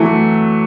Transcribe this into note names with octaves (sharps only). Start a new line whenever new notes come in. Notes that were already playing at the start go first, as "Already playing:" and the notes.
Already playing: E3 F#3 A3